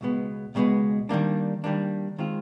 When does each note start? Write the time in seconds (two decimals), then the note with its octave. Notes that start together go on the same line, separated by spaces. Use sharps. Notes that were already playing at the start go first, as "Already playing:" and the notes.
0.01 C#2 B2 G#3 B3
0.55 C#2 B2 G#3 B3
1.09 D#3 G3 A#3 D4
1.64 D#3 G3 A#3 D4
2.18 D#3 G#3 C4 F4